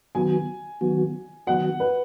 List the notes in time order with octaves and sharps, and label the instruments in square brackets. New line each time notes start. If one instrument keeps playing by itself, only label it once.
[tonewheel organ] D#3 F#3 B3 F#4 [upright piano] G#5
[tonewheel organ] D#3 F#3 B3 F#4
[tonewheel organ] D#3 F#3 B3 F#4 [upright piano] F#5
[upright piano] B4